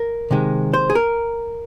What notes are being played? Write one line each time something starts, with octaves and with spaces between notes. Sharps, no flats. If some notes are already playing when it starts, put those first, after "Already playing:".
Already playing: A#4
C3 D#3 G#3
C5
G#4
A#4